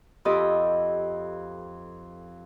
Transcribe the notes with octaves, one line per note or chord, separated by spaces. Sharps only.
F2 F4 G4 A4 D#5 B5